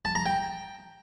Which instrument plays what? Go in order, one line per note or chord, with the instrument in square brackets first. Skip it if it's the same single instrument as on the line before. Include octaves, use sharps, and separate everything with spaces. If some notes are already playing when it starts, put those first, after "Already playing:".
[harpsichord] A5
A#5
G5